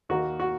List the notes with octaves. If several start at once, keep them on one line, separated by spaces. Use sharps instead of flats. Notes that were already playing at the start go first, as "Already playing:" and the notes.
D#2 D#3 A#3 F#4
F#4